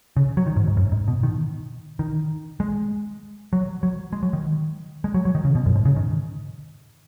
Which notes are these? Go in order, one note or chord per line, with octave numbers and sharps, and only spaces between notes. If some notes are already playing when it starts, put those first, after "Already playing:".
C#3
F#3
D#3
G#2
G#2
F#2
G#2
B2
D#3
D#3
G#3
F#3
F#3
G#3
F#3
D#3
G#3
F#3
F#3
D#3
C#3
B2
F#2
G#2
C#3
D#3